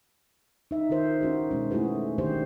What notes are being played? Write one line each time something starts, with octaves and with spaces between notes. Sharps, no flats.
D#4 E5
D#3 F4 A#4 C5
C#4 F#4 G#4
B2 G#3 C#4
A3 E4 F#4 G#4 B4
D3 D#3 D4 G4 C5